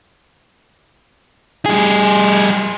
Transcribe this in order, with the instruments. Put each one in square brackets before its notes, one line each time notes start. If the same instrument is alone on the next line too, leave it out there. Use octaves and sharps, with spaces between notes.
[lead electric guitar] G3 G#4